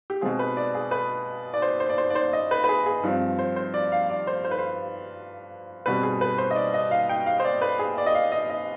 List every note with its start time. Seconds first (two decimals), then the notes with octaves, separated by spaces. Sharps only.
0.10 G4
0.21 B2 G#3 C4 G#4
0.39 B4
0.57 D5
0.75 G#4
0.91 B4
1.54 D5
1.62 C5
1.80 C5
1.89 D5
1.98 C5
2.10 D5
2.15 C5
2.33 D#5
2.51 B4
2.64 B4
2.69 G#4
2.86 G#4
3.03 G2 F3 C4
3.39 C5
3.56 C5
3.74 D5
3.92 F5
4.10 D5
4.27 C5
4.45 C5
4.51 B4
4.58 C5
5.86 B2 G3 C4 B4
6.03 G#4
6.21 B4
6.38 C5
6.51 D#5
6.56 D5
6.74 D#5
6.91 F5
7.09 G5
7.26 F5
7.40 C5
7.45 D5
7.62 B4
7.79 G#4
7.98 D5
8.06 D#5
8.15 F5
8.32 D#5
8.50 D#5